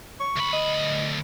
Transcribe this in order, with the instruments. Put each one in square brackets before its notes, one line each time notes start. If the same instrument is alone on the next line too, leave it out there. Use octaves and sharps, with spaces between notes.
[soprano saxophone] C#6
[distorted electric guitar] D2 B5
[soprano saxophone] D#5